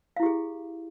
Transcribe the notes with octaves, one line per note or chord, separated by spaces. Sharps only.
E4 G4 G#4 F5